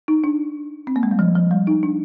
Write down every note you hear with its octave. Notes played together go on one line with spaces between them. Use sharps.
D#4
D4
C4
A#3
G#3
G3
F3
F3
G3
D#4
D4